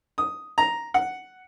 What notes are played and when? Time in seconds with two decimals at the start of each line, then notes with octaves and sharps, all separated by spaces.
0.18 D#6
0.58 A#5
0.94 F#5